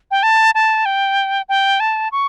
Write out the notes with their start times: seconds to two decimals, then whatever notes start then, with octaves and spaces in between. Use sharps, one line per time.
0.11 G5
0.23 A5
0.55 A5
0.85 G5
1.49 G5
1.80 A5
2.12 C#6